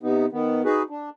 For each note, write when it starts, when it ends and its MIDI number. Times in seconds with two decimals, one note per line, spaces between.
0.03 0.26 48
0.03 0.26 59
0.03 0.26 63
0.32 0.62 51
0.32 0.62 59
0.65 0.82 63
0.65 0.82 66
0.65 0.82 68
0.65 0.82 71
0.90 1.09 62